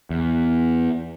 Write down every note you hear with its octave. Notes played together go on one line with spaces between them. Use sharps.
E2